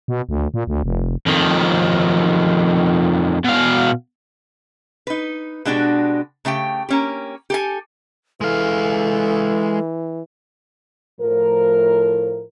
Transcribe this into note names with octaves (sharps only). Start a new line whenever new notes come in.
B2
D2
A#2
D2
F1
F2 D#3
B2 F5
D#4 B4
B2 G#3 D4 F#4 G4
C#3 A3 G4 G5
A#3 C#4 G4
G4 A4 G#5
E3 G#3 A4 F5
A2 F3 A#4